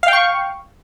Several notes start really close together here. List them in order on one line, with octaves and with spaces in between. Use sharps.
F5 G5 C#6